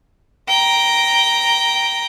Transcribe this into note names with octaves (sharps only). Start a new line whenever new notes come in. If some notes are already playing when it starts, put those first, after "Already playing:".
G5 A#5